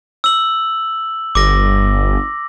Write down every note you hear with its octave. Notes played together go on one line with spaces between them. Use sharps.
E6 F#7
G1 D6 A#6